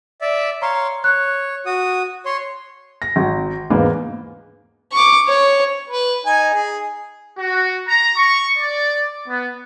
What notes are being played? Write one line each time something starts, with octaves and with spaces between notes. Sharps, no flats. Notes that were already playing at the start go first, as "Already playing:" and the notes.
D5 E5
C#5 F5 A#5 C6
C#5 F#6
F#4 D#6
C#5 C6
A#6
G#1
E2 G#2 C#3 A#3 B3
C#6 D6
C#5
B4
D#4 G#5
G#4
F#4
A#5
C#6
D5
B3